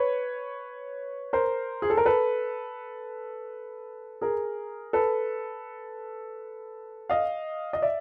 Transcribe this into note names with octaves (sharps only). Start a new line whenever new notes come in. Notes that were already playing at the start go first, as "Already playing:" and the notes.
Already playing: B4 C#5
A#4 C5
G#4
A4
A#4
A4 B4
G#4 A#4
A4 B4
D#5 F5
D#5
D5 E5